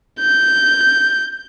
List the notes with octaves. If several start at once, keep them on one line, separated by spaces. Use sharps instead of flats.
G6